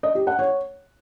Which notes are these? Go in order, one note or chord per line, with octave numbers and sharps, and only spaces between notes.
D#5
G4
F#5
C#5